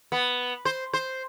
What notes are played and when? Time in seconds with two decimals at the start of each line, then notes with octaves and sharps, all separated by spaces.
0.12 B3
0.65 C5
0.94 C5